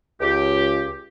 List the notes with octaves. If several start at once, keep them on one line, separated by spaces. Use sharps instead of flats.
C#2 G4